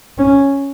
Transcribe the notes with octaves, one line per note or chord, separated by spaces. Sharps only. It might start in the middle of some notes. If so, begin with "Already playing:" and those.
C#4